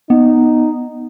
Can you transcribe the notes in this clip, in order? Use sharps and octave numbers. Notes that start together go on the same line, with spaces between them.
B3 D#4